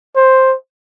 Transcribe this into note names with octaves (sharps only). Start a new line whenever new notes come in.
C5